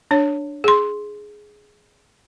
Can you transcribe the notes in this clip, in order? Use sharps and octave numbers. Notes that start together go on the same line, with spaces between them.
D4 C#5
G#4 C6